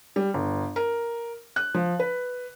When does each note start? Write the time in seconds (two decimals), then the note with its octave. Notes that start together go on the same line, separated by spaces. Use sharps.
0.16 G3
0.34 G1
0.76 A#4
1.56 F#6
1.74 F3
1.99 B4